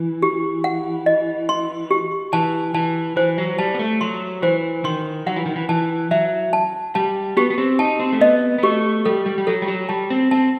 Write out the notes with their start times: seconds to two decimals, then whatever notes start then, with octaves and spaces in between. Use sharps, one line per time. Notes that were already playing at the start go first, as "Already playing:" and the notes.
Already playing: E3
0.22 G4
0.64 F#5
1.06 D#5
1.49 C6
1.91 G4
2.33 E3 A5
2.74 E3 A5
3.16 E3 C5
3.38 F#3
3.58 G3 A5
3.74 B3
3.79 A3
4.01 F#3 C6
4.42 E3 C5
4.84 D#3 C6
5.26 F#3 F#5
5.36 E3
5.46 D#3
5.56 E3
5.69 E3 A5
6.11 F#3 E5
6.53 A5
6.95 G3 A5
7.37 B3 G4
7.50 B3
7.58 C4
7.79 D#4 A5
8.00 C4
8.12 A3
8.21 B3 D#5
8.58 B3
8.63 A3 G4
9.05 G3 A4
9.26 G3
9.38 G3
9.47 F#3 A4
9.62 G3
9.68 F#3
9.89 G3 A5
10.10 C4
10.31 C4 A5